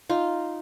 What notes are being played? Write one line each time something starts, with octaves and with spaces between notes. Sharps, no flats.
D#4 F4